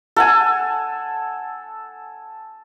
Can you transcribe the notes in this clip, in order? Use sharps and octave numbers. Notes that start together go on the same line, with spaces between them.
A4 F#5 G#5